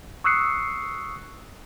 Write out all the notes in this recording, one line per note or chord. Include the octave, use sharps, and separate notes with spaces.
C#6 D#6 E6 F#6 C7 C#7